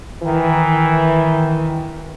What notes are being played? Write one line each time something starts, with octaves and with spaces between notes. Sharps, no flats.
D#3 E3